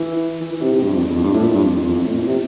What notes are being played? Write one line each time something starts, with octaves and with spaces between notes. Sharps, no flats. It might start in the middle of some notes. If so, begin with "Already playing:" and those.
Already playing: E3
E3
E3
C3
C3
G2
F2
E2
F2
G2
A2
A#2
G2
F2
E2
F2
F2
A2
A#2
C3